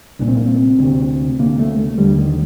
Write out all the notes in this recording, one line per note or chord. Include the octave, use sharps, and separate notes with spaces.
C2 A#2 D4
C4
A#3
C4
D2 C3
D2 C3 A#3
A3
A3
D#2 D3 G3
D#3